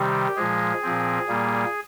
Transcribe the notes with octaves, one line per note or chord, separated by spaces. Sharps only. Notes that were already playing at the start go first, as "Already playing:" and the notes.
Already playing: C3 D#3 G3 G4
A#2 F3 G#3 G#4
A#2 F3 C4
A#2 G3 A#3